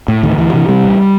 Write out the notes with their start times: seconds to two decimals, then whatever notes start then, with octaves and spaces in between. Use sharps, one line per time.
0.08 A2
0.23 D2 D#3
0.38 D2 E3
0.53 C3 E3
0.68 C3 G3
0.84 A1